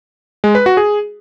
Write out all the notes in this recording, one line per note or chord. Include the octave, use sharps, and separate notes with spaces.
G#3
B4
F#4
G#4